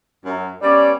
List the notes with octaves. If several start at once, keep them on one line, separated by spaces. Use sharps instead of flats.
F#2
G3 B3 C#4 D5